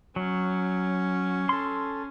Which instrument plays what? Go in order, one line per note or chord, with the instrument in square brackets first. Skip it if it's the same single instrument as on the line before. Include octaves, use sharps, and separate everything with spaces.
[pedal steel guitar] F#3 [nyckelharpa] C#4
[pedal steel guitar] A4 C6